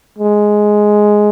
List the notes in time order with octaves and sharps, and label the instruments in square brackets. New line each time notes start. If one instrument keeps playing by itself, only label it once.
[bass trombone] G#3